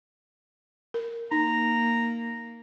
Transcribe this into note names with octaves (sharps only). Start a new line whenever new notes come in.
A#4
A#3 D#4 A#5